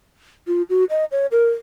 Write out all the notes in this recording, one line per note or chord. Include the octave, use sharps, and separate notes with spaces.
F4
F#4
D#5
C#5
A#4